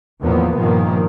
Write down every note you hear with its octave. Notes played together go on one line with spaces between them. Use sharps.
E2 A2 D#3 F3 A#3 B3
G2 A#2 D#3 F3 A#3